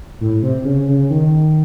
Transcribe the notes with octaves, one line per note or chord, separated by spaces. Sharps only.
A2
C3
C#3
C#3
D#3